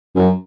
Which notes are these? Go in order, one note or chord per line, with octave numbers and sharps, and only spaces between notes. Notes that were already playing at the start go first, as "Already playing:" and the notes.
F#2